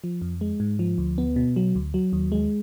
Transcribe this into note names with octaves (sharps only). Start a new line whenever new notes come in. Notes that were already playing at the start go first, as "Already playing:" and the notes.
F3
F2
G#3
G#2
F3
D2
B3
B2
F#3
D2
F#3
D#2
G#3